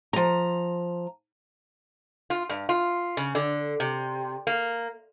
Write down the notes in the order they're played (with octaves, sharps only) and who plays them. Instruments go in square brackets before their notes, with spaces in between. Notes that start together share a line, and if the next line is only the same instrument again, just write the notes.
[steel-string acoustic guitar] F3 A#5
[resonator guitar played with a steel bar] F4
G2
F4
C#3
D3
C3
A#3